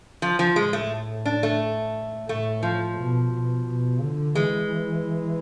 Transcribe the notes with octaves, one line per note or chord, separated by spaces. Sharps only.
F3
F3
A2 G#3
A3
D4
A3
A2 A3
F3
B2
B2
B2
D3
E3 G#3